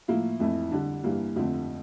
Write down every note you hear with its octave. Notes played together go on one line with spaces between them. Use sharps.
A2 F3 A#3 E4
F2 E3 A3 E4
D3 G3 D4
G2 E3 G3 A#3
F2 D3 F3 A3 C4